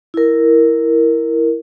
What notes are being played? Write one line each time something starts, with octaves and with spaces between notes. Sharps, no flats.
E4 A#4